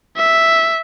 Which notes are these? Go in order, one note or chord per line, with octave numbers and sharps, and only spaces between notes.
E5